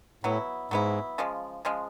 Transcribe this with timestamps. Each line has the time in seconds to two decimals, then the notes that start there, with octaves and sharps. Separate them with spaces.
0.24 A2 F#3 B3 E4
0.71 G#2 F#3 B3 E4
1.18 C#3 F3 G#3
1.65 C#3 F3 G#3